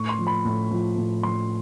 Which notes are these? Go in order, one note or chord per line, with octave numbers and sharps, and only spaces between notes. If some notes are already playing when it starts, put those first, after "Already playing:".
Already playing: A2 C#6
C6
F3
B5
A2
F3
A2
F3 C6